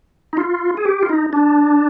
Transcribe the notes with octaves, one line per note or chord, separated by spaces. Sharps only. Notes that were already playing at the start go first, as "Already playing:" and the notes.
D#4
F4
G#4
G4
F4
D#4
D4